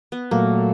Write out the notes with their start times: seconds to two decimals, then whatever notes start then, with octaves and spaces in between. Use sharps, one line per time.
0.12 B3
0.31 A#2 F#3 A3 A#3